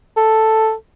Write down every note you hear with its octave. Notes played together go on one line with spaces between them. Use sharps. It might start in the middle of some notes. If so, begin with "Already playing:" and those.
A4